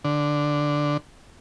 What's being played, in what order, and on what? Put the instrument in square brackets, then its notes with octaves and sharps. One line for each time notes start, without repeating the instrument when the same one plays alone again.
[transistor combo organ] D3